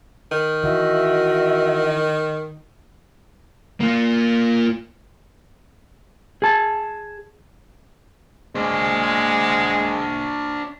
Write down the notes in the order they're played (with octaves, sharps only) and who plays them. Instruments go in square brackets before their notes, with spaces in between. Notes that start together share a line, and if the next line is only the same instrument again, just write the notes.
[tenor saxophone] D#3
[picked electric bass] E3 [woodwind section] F#4 E5 [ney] D#5
[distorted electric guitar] A#3 F4
[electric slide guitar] G#4 A5
[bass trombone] G#3 [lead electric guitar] D4 C5